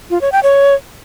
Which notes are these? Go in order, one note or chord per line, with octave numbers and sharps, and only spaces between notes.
F4
C#5
G5
C#5